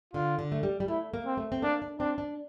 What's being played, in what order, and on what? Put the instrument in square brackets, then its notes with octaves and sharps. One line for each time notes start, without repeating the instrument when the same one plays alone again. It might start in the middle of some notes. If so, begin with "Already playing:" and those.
[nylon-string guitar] D3 [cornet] F4
[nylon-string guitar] D3
A3
G3
G3
[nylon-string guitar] A3 [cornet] E4
[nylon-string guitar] A#3
[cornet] C4
[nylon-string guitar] A3
C4
[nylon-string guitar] A#3 [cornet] D4
[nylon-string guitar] D4
[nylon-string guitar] C4 [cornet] D4
[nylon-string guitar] D4